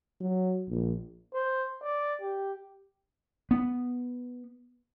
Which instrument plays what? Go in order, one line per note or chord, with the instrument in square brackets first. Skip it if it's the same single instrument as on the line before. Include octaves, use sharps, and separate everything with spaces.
[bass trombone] F#3
A#1
[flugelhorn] C5
D5
G4
[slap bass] B3